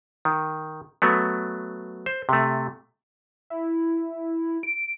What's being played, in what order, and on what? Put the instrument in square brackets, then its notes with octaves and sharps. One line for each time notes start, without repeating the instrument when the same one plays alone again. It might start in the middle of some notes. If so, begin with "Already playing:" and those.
[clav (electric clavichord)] D#3
F#3 A3 B3
C5
C3 A3
[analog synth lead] E4
D7